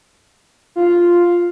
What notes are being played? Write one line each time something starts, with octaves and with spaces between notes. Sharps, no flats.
F4